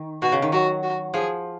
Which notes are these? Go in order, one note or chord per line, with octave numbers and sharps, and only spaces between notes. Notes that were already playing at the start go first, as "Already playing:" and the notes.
Already playing: D#3
B2 F#4
C#3
D#3
F#3 F#4
F#4
F3 G#4